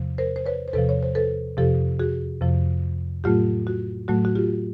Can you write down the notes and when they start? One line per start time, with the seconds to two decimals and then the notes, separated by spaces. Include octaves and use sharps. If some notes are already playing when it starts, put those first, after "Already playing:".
Already playing: E2 C3 F3
0.18 A#4 C5
0.36 C5
0.46 B4 C#5
0.68 C5
0.73 E2 C3 F3 A4 B4
0.89 C#5
1.03 C5
1.15 A4 B4
1.57 F2 C3 F3 G4 A4
1.99 F#4 G#4
2.41 F2 C3 F3
3.24 A2 F#3 A3 F4 G4
3.67 F#4
4.08 A2 F#3 A3 F#4
4.25 F#4
4.35 F4 G4